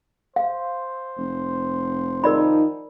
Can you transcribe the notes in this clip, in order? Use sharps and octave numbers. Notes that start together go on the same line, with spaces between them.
C5 F5
F1
D#3 F3 D#4 A#4 D5 B5